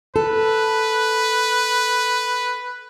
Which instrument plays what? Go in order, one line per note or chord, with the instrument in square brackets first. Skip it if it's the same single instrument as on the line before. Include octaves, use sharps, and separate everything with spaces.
[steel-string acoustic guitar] A4 [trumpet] B4